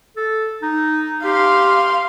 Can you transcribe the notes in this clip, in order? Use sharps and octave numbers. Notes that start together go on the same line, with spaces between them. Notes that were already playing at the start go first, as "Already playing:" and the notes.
A4
D#4
G4 F5 C6